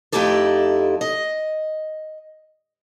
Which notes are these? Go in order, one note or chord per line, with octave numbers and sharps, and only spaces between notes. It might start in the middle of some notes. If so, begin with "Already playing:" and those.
F2 A3 D#4 E4 G4 A4
D#5